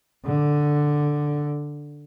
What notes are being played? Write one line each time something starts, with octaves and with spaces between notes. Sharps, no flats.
D3